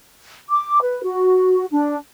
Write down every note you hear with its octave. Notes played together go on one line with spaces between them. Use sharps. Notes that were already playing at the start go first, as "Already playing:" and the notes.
D6
B4
F#4
D4